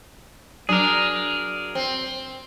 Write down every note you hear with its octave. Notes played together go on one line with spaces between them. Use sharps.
F#3 D4 G#4 A#4
C4